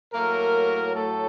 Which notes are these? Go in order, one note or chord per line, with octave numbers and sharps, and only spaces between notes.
A2 F#3 A3 A#3 A#4
A3 A4